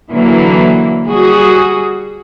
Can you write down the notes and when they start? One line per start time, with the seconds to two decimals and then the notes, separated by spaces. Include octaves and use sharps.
0.10 D3 E3 F#3 A#3
1.06 G3 F#4 G#4